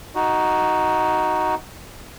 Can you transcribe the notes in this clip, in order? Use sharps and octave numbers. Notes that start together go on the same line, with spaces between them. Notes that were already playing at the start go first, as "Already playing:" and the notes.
D#4 F#4